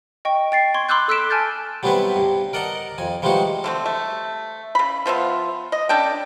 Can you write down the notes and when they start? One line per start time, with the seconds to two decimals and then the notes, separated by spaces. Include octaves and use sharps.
0.25 D#5 G5 C#6
0.52 G5 A6 C7
0.74 C6 C#6 G#6
0.89 B5 C6 D6 E6 F#6 G6
1.08 A4 E6 F#6 B6 D7 E7
1.30 G#5 A5 F6 G6 A6
1.83 F#3 G3 B3 C4 E4 B4
2.16 G2
2.53 A#4 D5 D#5 F#5 A5 A#5
2.98 F2 G#5
3.22 E3 F3 G3 G#3 D#4 F#4
3.64 D3 A3 C4
3.86 A3
4.75 C#3 B5
5.06 F3 B3 F4 E5
5.72 D#5
5.89 C#4 D4 A4 G5